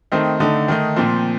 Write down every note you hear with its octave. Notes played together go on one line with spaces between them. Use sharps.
D#3 A3 C4 D#4
D3 A3 D#4
D#3 A3 D#4
A#2 F3 C4